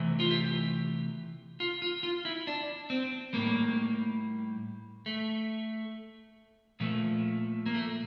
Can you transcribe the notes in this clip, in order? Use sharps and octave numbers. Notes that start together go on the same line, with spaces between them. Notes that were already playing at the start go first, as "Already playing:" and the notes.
Already playing: C3 E3 A3
F4
G4
F4
F4
F4
E4
D4
C4
A2 G3 A#3
A3
A#2 F3 A3
A#3
A3